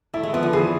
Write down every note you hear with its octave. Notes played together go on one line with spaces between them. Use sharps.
A3 E4
G#3
F3 B3
D3
E3 G#4